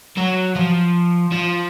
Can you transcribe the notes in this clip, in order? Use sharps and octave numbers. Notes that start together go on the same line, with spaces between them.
F#3
F3
F3